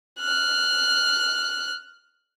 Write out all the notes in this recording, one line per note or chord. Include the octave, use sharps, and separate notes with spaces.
F6 F#6